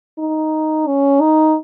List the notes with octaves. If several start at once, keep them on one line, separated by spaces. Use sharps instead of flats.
D#4
C#4
D#4